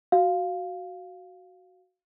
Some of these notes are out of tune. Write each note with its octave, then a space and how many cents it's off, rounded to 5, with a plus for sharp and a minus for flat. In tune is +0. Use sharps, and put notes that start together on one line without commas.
F#4 +0 F5 +0